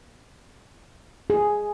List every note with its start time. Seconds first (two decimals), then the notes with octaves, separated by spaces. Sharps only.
1.30 G#4